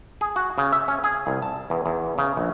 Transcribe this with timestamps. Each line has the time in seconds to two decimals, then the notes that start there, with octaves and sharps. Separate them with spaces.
0.21 G#4
0.36 F#4
0.58 C#3
0.73 E5
0.88 C#4
1.04 G#4
1.27 C2
1.42 A5
1.70 E2
1.86 E2
2.18 C#3
2.37 A#1